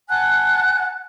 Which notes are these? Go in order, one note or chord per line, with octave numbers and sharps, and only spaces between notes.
F#5 G#5 A5 F#6